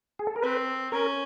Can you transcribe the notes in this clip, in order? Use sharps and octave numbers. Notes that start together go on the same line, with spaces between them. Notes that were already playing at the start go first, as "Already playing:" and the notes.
G#4
A4
A#4
C4 B4
C#4 A#4